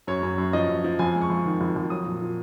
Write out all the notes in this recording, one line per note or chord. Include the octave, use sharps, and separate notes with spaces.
F#2 C#5
F#2
F#2
F3 D#5
F#2
F3
F2 G#5
G#3
C#6
F2
D#3
F2
F2
F#3 D#6
A#2
A#2